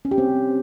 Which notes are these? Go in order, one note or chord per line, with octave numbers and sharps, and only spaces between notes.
C#4
G4
C4